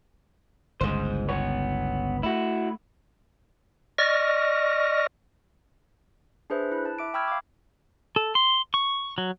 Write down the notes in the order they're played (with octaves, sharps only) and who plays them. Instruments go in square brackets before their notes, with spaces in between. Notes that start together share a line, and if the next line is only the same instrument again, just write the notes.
[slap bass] G1 C#2 [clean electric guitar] G#3 C5
[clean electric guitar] B3 C#5
[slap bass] A3 [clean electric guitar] E4 F#4
[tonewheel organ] D5 D#5 C#6 F6 A#6
[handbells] D4 G#4 B4 C5 E5
E4 F#6
A5
E5 D6 D7
G5 B5 C#6 E6 F6 G#6
F5 D6
[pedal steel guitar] A4
C6
C#6
F#3